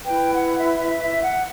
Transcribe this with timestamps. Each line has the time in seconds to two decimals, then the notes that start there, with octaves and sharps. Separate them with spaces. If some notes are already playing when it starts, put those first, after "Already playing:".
0.05 E4 B4 G5
0.32 F#5
0.58 E5
0.84 E5
1.03 E5
1.22 F#5